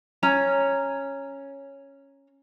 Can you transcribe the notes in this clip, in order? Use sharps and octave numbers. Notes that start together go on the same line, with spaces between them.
C#4 C#5 A#5